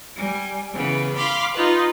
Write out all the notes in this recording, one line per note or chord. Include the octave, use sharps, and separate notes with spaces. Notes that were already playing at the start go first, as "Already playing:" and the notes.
G3 G#5
C#3 E3 B3
F5 B5 C6 D6
D#4 F4 B4